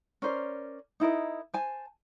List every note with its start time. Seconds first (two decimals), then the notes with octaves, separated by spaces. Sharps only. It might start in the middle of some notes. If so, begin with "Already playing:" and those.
0.22 C#4 A#4 C5 D5
1.00 D#4 E4 A#4 D#5
1.54 C5 G#5 A5